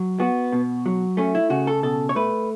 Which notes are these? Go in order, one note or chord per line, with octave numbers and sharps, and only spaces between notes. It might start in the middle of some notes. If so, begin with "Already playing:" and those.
Already playing: F#3
B3 F#4
B2
F#3
A3 C#4
E4
C#3 F#4
A4
B2 A4
C#5
A3 B4